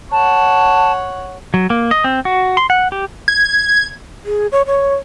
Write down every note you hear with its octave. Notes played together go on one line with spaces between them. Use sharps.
C#5 F#5 A5
F#3
A#3
D#5
C4
F#4
C6
F#5
G4
G#6
G#4
C#5
C#5